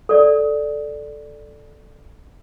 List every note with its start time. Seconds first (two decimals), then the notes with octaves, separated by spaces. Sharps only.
0.09 A4 D5